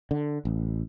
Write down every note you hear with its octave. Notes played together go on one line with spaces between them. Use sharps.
D3
A1